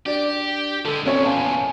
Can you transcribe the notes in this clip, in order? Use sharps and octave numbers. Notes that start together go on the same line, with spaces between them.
D4 G4 D5
D3 G#3 A4
E2 A#2 C4 C#4 C#5
F5 G#5 A5